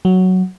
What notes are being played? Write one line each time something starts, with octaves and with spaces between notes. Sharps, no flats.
F#3